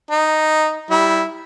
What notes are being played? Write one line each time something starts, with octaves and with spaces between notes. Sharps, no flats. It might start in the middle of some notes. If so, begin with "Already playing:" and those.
D#4
G3 E4